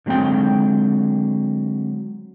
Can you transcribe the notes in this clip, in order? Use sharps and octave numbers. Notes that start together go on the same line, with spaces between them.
D3 F#3 G#3 C4 G5